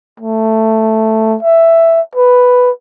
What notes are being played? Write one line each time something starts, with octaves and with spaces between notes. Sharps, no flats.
A3
E5
B4